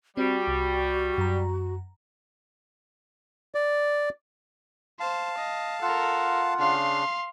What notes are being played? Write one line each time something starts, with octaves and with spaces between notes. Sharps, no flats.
G3 C4 F#4
C2
F#2 A#5
D5
C5 F5 A5
D#5
F4 A4 A#4 F#5
C#3 D4 F5 C6